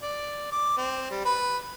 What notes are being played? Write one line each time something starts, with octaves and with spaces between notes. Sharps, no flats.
D5
D6
C4
G3
B4